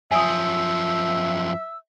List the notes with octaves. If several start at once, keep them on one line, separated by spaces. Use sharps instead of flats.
F#2 F3 E5 G#5 D#6 E6